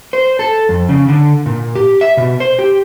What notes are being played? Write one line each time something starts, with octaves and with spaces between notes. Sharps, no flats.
C5
A4
F2
C#3
D3
A#2
G4
E5
B2
C5
G4